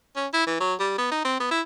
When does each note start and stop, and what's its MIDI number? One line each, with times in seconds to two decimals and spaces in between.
0.16 0.27 61
0.33 0.46 64
0.47 0.59 52
0.60 0.74 54
0.80 0.97 55
0.98 1.07 59
1.11 1.21 63
1.25 1.38 60
1.40 1.51 59
1.51 1.61 64